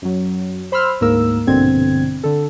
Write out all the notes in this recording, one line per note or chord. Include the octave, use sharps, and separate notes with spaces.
F#2 F#3
C5 B5 C6 E6 F6
D2 G#2 A#3 A#4 E6
A#1 G2 B2 D3 C4 G#6
D3 A4